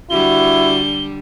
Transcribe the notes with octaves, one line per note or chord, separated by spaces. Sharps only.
D3 G3 E4 F#4 G7